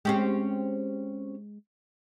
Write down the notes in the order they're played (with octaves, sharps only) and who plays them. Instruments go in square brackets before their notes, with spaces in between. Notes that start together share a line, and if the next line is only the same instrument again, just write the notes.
[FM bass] G#3 [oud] C4 C#4 G4